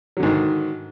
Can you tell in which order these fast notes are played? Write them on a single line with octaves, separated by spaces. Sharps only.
F#3 D3 G#2 D#3